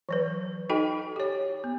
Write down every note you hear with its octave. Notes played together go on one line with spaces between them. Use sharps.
E3 F#3 B4
D#4 F#4 A4 D#5 G5
G4 C#5
B3